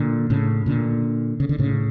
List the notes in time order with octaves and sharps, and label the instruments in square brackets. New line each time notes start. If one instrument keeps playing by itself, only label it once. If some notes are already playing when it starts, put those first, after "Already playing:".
Already playing: [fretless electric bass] A#2 D3
A2 C#3
A#2 D3
C#3
D3
A2 C#3